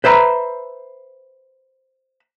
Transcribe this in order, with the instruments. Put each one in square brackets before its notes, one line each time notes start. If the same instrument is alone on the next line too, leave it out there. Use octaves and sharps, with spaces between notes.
[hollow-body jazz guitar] B4 C5 E5 A#5 B5